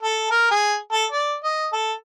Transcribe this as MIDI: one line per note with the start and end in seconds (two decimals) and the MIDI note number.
0.02 0.27 69
0.31 0.47 70
0.51 0.76 68
0.92 1.05 69
1.11 1.35 74
1.44 1.68 75
1.73 1.93 69